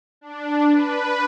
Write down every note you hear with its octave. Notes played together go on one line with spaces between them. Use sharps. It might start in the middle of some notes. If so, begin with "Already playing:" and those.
D4
B4